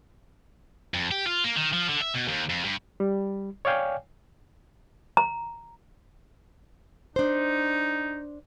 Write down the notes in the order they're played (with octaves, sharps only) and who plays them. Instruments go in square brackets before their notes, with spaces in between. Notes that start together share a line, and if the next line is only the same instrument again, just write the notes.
[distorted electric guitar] F2
G4
F4
A#3
D#3
F3
D3
E5
B2
D#2
F2
G2
[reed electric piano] G3
C#5 D5 F5 G5 G#5
[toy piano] A#5
[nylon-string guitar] D4 C5 [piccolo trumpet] D#4